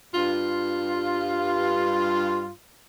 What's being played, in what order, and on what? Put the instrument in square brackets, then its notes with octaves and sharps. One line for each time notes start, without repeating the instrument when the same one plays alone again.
[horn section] G2 F4